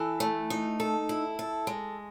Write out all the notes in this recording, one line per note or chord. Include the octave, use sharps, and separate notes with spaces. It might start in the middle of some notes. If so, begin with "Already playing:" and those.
Already playing: E3 A4
A3
D#4
A4
E4
A4
G#3